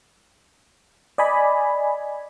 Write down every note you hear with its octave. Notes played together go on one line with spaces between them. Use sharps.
D5 D#5 G#5 B5